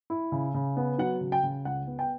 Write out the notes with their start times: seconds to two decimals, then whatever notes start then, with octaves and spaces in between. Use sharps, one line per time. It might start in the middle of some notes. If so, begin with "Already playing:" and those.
0.10 E4
0.32 C#3
0.54 C#3
0.76 B3
0.98 F#3 F#5
1.21 C#3
1.32 G5
1.43 C#3
1.65 C#2 F#5
1.87 B3
1.99 G5